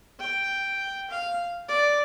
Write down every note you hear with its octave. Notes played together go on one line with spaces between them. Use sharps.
G5
F5
D5